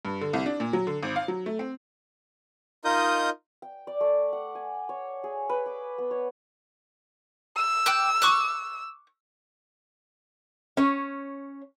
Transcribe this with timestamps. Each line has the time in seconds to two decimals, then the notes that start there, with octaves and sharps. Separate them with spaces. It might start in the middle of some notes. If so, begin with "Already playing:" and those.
0.05 G2
0.21 D3
0.33 C2
0.46 D4
0.60 A#2
0.73 F#3
0.87 D3
1.03 G#1
1.16 F5
1.28 F#3
1.46 A3
1.59 C4
2.85 D#4 F4 A#4 D#5 D#6 G6
3.62 G5
3.87 D5
4.01 A3
4.33 F#5
4.55 G#5
4.89 C#5
5.24 G#4
5.49 B4
5.66 D6
5.98 B3
6.11 C#5
7.56 E6
7.86 G5 D6 F#6
8.22 C#6 D6 F#6
10.77 C#4 C#5